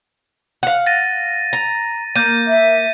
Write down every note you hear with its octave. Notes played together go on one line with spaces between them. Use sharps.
F5 F#5
A6 A#6 D#7
A#5
A#3 G6 D#7
E5